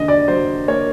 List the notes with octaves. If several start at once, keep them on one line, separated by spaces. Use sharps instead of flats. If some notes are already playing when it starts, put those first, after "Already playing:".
Already playing: D#2 D3 D#5
D5
F#3 C5
A#3 C#5